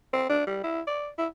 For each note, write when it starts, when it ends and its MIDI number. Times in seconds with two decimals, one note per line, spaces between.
0.13 0.25 60
0.29 0.47 62
0.47 0.59 55
0.64 0.81 64
0.87 1.09 74
1.18 1.27 64